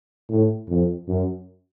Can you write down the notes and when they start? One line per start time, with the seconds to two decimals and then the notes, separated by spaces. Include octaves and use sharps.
0.29 A2
0.68 F2
1.08 F#2